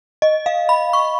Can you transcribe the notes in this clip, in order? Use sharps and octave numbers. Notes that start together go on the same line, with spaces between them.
D#5
F5
B5
C#6